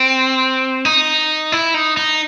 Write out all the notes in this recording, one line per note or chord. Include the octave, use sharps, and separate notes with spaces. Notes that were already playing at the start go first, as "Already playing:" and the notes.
Already playing: C4
D#4
E4
D#4
D#4